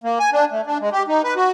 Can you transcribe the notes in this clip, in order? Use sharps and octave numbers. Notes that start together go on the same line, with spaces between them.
A#3
G#5
D4
A3
D4
G#3
G4
D#4
B4
F#4